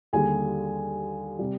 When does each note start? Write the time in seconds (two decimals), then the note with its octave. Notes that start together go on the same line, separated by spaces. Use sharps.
0.13 D#2 D3 G3 G#4 G#5
1.39 C3 G3